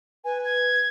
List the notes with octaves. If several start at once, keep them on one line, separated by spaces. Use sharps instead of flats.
B4 G#5
G#6